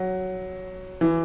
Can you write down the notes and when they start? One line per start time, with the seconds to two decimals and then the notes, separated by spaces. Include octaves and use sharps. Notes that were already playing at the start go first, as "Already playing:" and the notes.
Already playing: F#3
1.01 E3